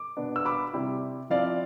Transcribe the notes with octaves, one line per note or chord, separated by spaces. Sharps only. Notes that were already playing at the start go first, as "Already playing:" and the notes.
Already playing: D6
B2 B3 D4
E6
B5 D6
C3 G3 C4 E4
F3 C4 E4 D5 F5